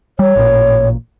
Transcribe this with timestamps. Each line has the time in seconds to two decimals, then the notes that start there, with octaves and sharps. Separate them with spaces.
0.19 G3 C#5
0.36 A1 A#2